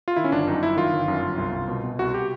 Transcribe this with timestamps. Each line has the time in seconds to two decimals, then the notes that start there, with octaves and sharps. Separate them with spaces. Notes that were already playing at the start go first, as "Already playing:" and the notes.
0.08 F4
0.16 D#3 E4
0.24 C#4
0.32 G1 D4
0.47 F#2 D#4
0.62 G1 E4
0.77 D#3 F4
0.93 G1
1.08 F#2
1.23 G1
1.38 C2
1.53 C2
1.68 B2
1.84 B2
1.99 C2 F#4
2.14 G4